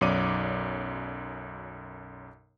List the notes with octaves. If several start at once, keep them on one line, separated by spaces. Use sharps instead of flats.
B1 F#2 C#5 D5 D6 D#7